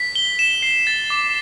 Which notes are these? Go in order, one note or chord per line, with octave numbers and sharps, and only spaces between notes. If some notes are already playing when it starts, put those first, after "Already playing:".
Already playing: B6
G7
E7
C7
A6
D6